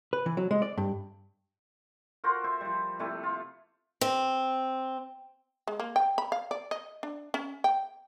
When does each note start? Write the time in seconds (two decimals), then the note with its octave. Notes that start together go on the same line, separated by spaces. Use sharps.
0.13 B4
0.26 E3
0.37 F#3
0.51 G#3
0.62 D5
0.77 G2
2.24 F4 F#4 A#4 C5
2.44 C5 E5
2.61 F3 G3
2.99 C3 G3 A3 E4
3.23 F4
4.01 C4
5.67 G#3
5.80 A#3
5.96 G5
6.18 B5
6.32 F5
6.51 D5
6.71 D#5
7.03 D4
7.34 C#4
7.64 G5